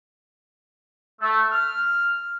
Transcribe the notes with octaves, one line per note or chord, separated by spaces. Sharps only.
A3
F6